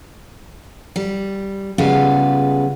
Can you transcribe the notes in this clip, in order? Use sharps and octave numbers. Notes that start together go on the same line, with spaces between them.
G3
C#3 G3 G#3 B3 F4